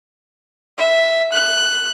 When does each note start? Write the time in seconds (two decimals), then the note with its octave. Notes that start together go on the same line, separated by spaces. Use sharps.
0.78 E5
1.32 F#6